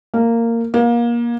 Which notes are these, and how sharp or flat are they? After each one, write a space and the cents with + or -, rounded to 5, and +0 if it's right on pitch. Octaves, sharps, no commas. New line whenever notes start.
A#3 -15
A#3 +25